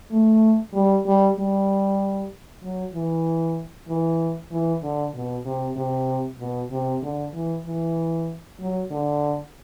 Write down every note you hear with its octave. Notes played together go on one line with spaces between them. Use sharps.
A3
G3
G3
G3
F#3
E3
E3
E3
D3
B2
C3
C3
B2
C3
D3
E3
E3
F#3
D3